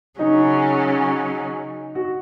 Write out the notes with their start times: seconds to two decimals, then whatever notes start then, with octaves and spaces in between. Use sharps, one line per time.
0.19 C#3 F#3 C#4 D#4
1.95 F#4